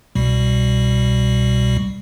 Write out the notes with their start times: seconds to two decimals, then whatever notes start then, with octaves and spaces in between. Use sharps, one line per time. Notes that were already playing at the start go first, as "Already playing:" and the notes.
0.15 C2 B2 G3